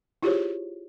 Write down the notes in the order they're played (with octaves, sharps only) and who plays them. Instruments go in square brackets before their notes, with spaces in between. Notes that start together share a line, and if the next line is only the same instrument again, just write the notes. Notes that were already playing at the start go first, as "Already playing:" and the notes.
[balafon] E4 F4 G4 G#4 C5 C#5